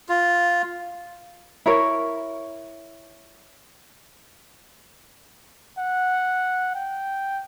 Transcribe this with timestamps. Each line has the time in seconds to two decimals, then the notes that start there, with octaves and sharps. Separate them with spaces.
0.09 F4
1.66 E4 A#4 C#5
5.78 F#5
6.75 G5